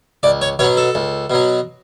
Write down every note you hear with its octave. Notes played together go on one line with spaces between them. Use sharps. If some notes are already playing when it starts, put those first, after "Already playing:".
C#2 D5
C#5
B2 F#3 C#5
A4
C#2
B2 F#3